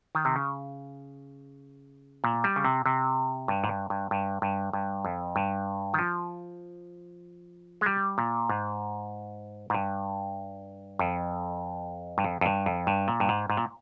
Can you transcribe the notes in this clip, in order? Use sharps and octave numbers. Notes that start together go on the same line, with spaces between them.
D#3
C3
C#3
A#2
G3
C#3
C3
C3
G2
G#2
G2
G2
G2
G2
G2
F2
G2
D#3
F3
G#3
G3
A#2
G#2
G#2
G2
F2
G2
F2
F2
G2
F2
G2
A#2
G2
G#2
G#2
A#2